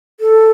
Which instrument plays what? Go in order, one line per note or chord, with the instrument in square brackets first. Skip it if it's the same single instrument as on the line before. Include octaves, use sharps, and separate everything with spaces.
[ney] A4